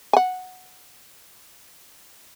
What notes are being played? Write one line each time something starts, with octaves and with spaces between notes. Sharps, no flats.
F#5 G#5